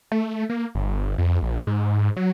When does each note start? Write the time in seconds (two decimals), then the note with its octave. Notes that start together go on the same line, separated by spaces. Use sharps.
0.12 A3
0.50 A#3
0.75 G1
1.18 F2
1.42 A#1
1.67 G#2
2.17 F#3